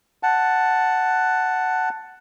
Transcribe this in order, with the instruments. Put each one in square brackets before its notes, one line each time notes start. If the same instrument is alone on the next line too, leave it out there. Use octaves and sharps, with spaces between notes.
[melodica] F#5 A5